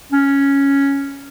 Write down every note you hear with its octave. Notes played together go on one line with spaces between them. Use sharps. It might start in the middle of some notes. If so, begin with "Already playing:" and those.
C#4